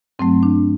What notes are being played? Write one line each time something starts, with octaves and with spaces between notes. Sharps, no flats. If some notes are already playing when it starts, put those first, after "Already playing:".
G2 F#3 A3 C4
D4